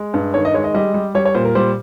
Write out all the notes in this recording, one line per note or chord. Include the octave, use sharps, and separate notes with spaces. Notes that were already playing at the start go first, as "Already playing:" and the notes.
Already playing: G#3
G2
D#3 C#5
D#5
G#3 C#5
D#5
G3 D#5
G3
G3 C#5
C#5
A#2 C5
A#4
G3 C5